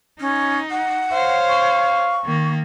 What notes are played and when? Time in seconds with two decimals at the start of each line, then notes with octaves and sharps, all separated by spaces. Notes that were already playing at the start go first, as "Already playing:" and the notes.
0.20 C#4 D#4
0.71 F#5
1.13 C5 C#5 F5
1.49 C#6
2.24 D#3 A#3